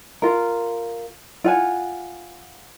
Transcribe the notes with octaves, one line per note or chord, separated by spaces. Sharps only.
F4 A#4
F4 F#5 G#5